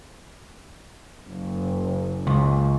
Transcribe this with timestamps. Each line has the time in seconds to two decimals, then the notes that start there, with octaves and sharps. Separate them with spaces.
1.27 F#1
2.27 C#2